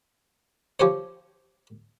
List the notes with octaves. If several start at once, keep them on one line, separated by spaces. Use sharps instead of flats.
F3 G4 C5 C#5